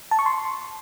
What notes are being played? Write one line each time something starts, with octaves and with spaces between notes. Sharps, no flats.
A5
C#6
C6